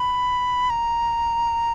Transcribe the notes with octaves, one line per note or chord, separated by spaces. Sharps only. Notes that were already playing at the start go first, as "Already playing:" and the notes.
Already playing: B5
A#5